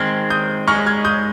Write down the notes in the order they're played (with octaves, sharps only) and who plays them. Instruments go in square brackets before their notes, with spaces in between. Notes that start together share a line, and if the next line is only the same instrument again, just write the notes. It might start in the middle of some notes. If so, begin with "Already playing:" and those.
Already playing: [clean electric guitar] D#3 G#3 C4 [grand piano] F6 G#6
[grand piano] D#6 G6
[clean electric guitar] G#3 D#4 G#4 [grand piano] C#6 F6
[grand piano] F6 G#6
D#6 G6